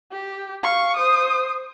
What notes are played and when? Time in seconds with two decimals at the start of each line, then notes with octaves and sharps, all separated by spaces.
0.12 G4
0.63 F5 C#6
0.97 C5 D#6